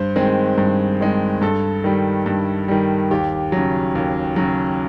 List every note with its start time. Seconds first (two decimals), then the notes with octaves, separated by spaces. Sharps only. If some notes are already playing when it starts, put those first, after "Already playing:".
Already playing: G2 C5
0.16 D#3 G#3 C4
0.58 G2
1.00 D#3 G#3 C4
1.41 G2 A4
1.84 D#3 G3
2.26 G2
2.68 D#3 G3
3.11 D#2 G4
3.52 C#3 F#3
3.95 D#2
4.36 C#3 F#3